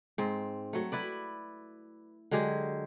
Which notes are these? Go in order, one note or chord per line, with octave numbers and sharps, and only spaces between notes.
G#2 C4
F#3 A3
E4 B4 D5
D3 F#3 G#3 G4